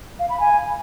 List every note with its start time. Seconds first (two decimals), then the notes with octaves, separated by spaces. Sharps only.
0.19 F5
0.30 B5
0.40 G#5